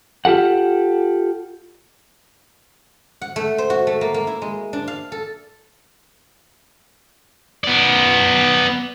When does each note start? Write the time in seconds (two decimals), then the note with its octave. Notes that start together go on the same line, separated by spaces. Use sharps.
0.25 F4 G4 A4 F#5
3.22 F#5
3.36 A3
3.58 C5
3.70 F#4
3.87 A3
4.01 A#3
4.14 A#3
4.27 E4
4.42 G#3
4.73 D4
4.88 F5
5.12 A4
7.64 B3 D5